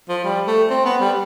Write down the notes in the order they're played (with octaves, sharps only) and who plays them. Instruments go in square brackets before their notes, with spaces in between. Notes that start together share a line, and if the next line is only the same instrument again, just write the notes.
[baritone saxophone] F3
G3
A3
C4
B3
G3